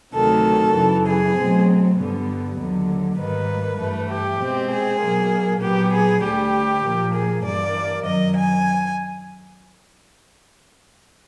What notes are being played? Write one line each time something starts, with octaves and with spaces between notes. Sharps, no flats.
D2 C3 D#3 F#3 A4
F#2 C#3 E3
G#4
B2 F#3 A3 C4
G2 D3 G3 B3
D#2 D3 F#3
G#2 D#3 G3 A#3 B4
G2 E3 A3
G4
B2 G#3 C4
G#4
B2 F#3 A#3
A#2 F#3 B3 G4
G#4
D2 D3 G3 G4
A#2 F3 A#3
G#4
G2 E3 G3 A#3 D5
F#2 D#3 F#3 D#5
G#5